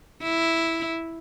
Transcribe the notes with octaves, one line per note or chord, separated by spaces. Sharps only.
E4